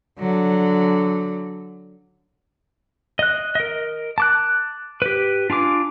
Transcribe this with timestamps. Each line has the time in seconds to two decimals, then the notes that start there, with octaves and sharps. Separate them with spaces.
0.19 D3 F#3
3.19 D#5 F#6
3.55 A#4 D#5
4.18 A5 D6 F#6
5.02 G4 B4
5.50 D4 F4 G#5 D6